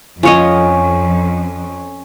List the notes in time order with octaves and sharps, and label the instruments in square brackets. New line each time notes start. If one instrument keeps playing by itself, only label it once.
[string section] F2 [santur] C#4 [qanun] F4 C#5 D#5